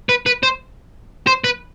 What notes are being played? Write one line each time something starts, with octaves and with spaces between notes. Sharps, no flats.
B4
B4
C5
C5
B4